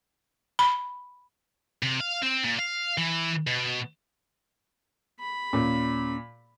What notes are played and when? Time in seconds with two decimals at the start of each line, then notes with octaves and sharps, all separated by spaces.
0.59 B5
1.83 C3
2.00 F5
2.22 C4
2.44 A#2
2.59 F5
2.98 E3
3.47 B2
5.20 B5
5.53 D#2 A#2 C#4